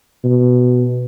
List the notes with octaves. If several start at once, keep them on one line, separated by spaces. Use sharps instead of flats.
B2